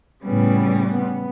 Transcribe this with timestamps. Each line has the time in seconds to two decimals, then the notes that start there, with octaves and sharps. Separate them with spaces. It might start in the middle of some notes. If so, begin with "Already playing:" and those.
0.24 A2 C#3 G3 B3
0.91 B3